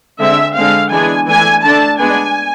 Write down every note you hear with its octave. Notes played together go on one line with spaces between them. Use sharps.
D3 G#3 C4 E5
D3 G#3 C4 F5
E3 G#3 B3 D4 G#5
E3 A3 D4 G#5
D3 A3 D4 A5
G#3 B3 D4 G#5